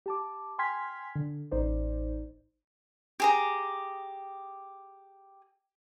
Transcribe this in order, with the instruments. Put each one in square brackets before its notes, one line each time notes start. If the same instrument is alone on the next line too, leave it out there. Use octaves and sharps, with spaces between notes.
[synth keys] G4 A5 D6
G5 G#5 C6 F6 G#6 B6
D3
A1 D#4 C5 D5
[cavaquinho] G4 G#4 A#5